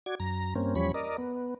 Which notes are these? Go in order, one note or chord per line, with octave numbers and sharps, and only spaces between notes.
F#4 D5 G#6
F#2 A#5
G2 A#3 C4 C#4
E2 F3 G3 C#4 C#5 B5
A#4 D5 D#5
B3